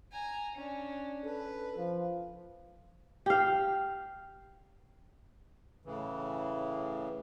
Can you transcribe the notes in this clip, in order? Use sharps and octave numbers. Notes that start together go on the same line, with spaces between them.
G#5 A#5
C#4 D4
A4 B4
F3
G4 F5
A2 C#3 E3